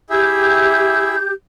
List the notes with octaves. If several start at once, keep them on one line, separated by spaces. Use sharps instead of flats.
E4 G4 G#4 E5 G6